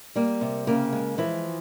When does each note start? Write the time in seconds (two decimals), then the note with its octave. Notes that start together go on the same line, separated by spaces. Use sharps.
0.16 G3 A#3 A#4
0.41 C3
0.67 C#3 A#3 A#4
0.93 G#3
1.18 E3 F3 E4